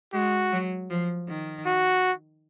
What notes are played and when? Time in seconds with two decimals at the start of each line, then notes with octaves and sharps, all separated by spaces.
0.13 G#3 F#4
0.52 F#3
0.90 F3
1.29 D#3
1.66 F#4